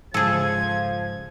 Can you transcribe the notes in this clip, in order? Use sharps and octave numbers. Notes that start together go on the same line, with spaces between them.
G#2 C#3 F3 G#4 A4 G#6